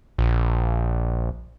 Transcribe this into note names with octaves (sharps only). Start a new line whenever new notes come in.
A#1